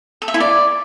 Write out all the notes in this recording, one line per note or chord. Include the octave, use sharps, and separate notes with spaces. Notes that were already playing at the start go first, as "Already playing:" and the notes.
A4
E5
E4
D5